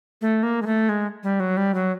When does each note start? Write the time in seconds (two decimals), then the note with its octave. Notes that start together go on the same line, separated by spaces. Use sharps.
0.21 A3
0.43 A#3
0.62 G#3
0.66 A3
0.89 G#3
1.23 G3
1.40 F#3
1.57 G3
1.74 F#3